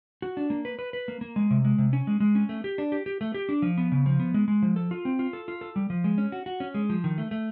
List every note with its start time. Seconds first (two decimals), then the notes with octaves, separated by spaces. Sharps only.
0.22 F#4
0.37 D4
0.50 A#3
0.65 B4
0.79 B4
0.93 B4
1.08 A#3
1.21 A#3
1.36 G#3
1.50 C3
1.65 G#3
1.78 C3
1.93 C#4
2.07 G#3
2.20 G#3
2.35 C#4
2.49 A3
2.64 G4
2.78 D4
2.92 G4
3.06 G4
3.21 A3
3.34 G4
3.49 D4
3.62 F3
3.78 B3
3.92 C#3
4.06 F3
4.20 B3
4.34 G#3
4.48 G#3
4.62 F3
4.76 A4
4.91 F4
5.05 C4
5.19 F4
5.33 A4
5.48 F4
5.61 A4
5.76 G3
5.90 F3
6.04 G#3
6.18 C#4
6.32 F#4
6.46 F#4
6.60 C#4
6.74 G#3
6.90 F3
7.04 D#3
7.18 A3
7.31 A3